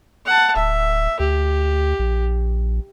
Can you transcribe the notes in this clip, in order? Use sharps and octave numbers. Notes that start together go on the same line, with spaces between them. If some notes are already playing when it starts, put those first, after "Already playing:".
F#5 A5
D1 E5
D2 G4
A#1